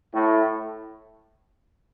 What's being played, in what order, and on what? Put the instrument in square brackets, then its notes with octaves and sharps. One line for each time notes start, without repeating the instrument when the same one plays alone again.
[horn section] A2